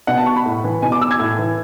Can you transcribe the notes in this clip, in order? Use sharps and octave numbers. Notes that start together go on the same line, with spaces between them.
B2 F#5
A5
C#6
B5
A2
E3
B2 G#5
D6
E6
G#6
A2
E3